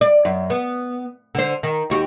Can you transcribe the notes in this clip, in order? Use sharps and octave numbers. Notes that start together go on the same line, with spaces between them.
D5
F#2
B3
D3 C5
D#3
D#2 F#4 G4